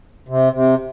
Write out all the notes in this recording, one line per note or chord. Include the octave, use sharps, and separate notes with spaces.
C3
C3